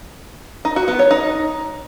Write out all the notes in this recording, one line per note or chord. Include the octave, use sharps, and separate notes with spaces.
D#4
F#4
B3
C#5
D#4